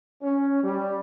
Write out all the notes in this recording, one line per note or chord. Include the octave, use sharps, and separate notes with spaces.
C#4
G3